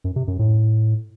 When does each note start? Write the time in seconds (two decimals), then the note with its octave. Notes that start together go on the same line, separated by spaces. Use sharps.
0.04 F#2
0.16 C3
0.28 F#2
0.39 A2